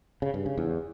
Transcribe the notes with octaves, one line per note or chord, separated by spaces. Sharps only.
C#3
G2
C#3
E2